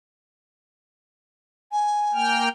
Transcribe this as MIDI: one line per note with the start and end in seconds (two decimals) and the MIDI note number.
1.72 2.43 80
2.14 2.49 58
2.14 2.49 79
2.14 2.49 89